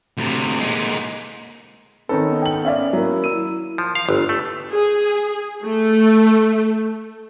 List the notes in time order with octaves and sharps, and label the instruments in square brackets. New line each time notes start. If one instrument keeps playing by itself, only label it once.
[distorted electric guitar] D2 C3
A#2 G#3
[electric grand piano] D#3 D#4 A4 [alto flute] C4 [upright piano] C#4 B4
[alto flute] B3
[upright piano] G5 F#7
[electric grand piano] C#4 [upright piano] D5 E5 F5
[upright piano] F#3 A#3 [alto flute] E4
[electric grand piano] E6 D#7
[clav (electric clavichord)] F3
F5
G1
A3
[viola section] G#4
A3